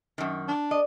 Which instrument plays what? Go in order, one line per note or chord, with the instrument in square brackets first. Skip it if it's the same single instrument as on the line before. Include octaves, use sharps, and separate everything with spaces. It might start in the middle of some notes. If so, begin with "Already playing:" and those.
[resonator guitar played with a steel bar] F#2 D#3
[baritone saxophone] D4
[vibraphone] D5 [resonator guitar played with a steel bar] D#5